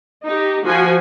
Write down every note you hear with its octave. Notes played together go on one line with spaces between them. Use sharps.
D#4 G4
F3 F#4 G#5